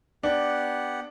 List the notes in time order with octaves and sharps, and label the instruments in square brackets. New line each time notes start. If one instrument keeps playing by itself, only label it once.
[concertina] B3 G4 F#5 [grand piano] D4